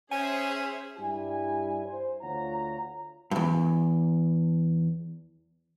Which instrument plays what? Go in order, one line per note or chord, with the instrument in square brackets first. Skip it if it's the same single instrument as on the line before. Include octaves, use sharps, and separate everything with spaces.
[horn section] C#4 [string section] G#4 C5 E5 [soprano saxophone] G#5
[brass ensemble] G2 G3 E4 G4 G#5
C5
D2 F4 C#5 F#5 A#5
[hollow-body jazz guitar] E2 G2